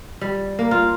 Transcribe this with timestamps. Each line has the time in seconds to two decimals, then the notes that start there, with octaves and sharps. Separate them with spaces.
0.21 G3
0.59 A#3
0.71 F4